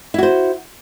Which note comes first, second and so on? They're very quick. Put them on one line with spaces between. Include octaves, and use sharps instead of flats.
E4 F#4 C5